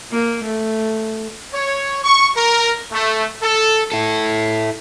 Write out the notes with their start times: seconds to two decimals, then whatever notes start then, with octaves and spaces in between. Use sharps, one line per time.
0.11 A#3
0.45 A3
1.54 C#5
2.04 C#6
2.36 A#4
2.91 A3
3.42 A4
3.92 E4 A4